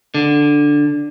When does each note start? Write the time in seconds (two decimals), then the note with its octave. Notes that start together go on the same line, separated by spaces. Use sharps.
0.15 D3